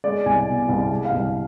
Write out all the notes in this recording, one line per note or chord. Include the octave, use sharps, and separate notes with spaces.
G#3 D5
C2 G#5
B2
C2
G#3
F5
C2